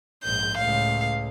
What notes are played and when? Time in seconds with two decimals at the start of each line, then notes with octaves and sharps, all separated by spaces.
0.24 A#1 G#2 G6
0.58 C#2 A2 F5